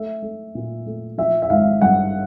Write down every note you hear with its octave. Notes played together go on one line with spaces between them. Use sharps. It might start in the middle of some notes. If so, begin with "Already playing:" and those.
Already playing: A3 E5
A3
A#2
A3
F3 E5
E5
G#1 F5
G2 F#5